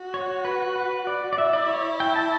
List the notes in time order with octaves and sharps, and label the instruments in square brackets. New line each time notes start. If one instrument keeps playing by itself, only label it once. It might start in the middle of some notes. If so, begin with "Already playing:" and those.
Already playing: [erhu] F#4
[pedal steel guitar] C#5
B4
B4
D5
D5
[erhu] E4 [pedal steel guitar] E5
[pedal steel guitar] D5
C#5
G5
A5